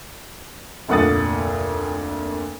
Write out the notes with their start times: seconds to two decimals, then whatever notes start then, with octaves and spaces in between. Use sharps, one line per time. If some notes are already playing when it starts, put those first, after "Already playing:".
0.88 F1 D2 A#2 F#5 D#6 A6